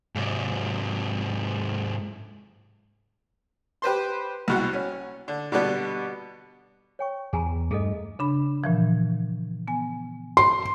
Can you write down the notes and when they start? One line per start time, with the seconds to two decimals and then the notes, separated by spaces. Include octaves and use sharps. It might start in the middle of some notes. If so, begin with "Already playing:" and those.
0.15 G#2 C3
3.82 G4 B4 C5 C6
4.48 C2 B2 F#5
4.73 C#4
5.28 D3
5.52 B2 D3 G3 B3
6.99 C#5 G5 C#6
7.33 E2 G#4 G#5 A#5
7.71 G2 A3 G#4 A4 D#5
8.19 C#3 D4 B5
8.64 A#2 E3 F3
9.68 B3 G#5
10.37 C6